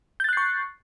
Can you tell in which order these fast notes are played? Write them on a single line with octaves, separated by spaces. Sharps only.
G6 A6 F#6 C7 C#6